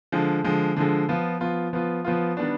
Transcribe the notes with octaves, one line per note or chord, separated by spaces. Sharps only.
D3 F3 G#3
D3 F3 G#3
D3 F3 G#3
F3 B3 F4
F3 B3 F4
F3 B3 F4
F3 B3 F4
D#3 G3 B3 D4